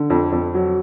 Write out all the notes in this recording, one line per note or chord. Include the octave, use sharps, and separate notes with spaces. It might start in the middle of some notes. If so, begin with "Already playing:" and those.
Already playing: D3
F2
F2
F#3